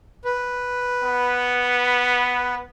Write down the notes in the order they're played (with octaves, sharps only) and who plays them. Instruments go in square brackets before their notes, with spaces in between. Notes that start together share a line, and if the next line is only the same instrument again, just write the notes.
[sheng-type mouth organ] B4
[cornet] B3